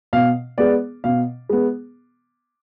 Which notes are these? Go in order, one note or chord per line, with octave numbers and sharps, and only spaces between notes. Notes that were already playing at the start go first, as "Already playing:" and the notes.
B2 F5
G#3 B3 D5
B2 F5
G#3 B3